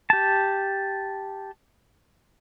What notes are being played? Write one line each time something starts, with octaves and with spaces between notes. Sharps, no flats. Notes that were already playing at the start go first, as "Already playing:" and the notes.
G4 A5